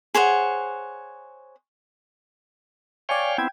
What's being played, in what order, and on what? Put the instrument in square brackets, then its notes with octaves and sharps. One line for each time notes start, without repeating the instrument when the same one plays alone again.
[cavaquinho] G#4 C5 C#5 F#5
[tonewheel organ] C#5 F5 G5 [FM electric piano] D5 G#5 C#6
[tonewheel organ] B3 C4 E4 [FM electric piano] G5 G#6